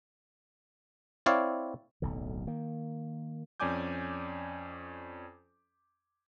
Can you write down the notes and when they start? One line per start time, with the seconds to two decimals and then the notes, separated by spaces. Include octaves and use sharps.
1.26 C4 E4 C#5 D5 F5
2.02 D1 B1 D3
2.47 D#3 A#3
3.60 F2 C#4 D5 G#5 D6 G6